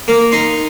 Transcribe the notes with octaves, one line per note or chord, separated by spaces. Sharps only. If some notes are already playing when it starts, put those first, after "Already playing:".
A#3
D#4 C6